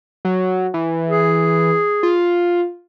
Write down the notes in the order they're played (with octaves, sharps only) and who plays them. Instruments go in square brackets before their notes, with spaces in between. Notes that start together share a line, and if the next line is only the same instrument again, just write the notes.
[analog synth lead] F#3
E3
[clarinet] G#4
[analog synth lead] F4